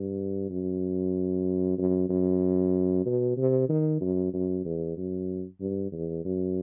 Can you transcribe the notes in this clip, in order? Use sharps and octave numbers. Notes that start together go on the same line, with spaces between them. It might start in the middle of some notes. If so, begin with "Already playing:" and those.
Already playing: G2
F#2
F#2
F#2
B2
C3
D#3
F#2
F#2
E2
F#2
G2
E2
F#2